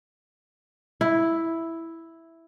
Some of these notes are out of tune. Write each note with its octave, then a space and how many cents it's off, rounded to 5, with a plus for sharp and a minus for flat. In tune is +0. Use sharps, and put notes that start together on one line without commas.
E4 +0